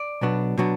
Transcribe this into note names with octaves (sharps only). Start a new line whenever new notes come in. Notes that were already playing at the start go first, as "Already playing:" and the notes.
Already playing: D5
B1 B2 F#3 B3 D4
B2 F#3 B3 D4